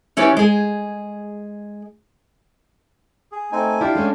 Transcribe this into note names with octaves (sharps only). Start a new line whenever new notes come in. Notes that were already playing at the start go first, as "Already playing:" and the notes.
E3 C#4 E4 G4 B4 D5
G#3 G#4
G#4
A3 C4 D#4 G#5
D4 E4 F4 G4 D5 F5 G5
G#3 A3 C#4